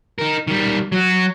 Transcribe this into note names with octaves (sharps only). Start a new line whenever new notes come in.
D#4 A#4
D#3 G3
F#3 F#4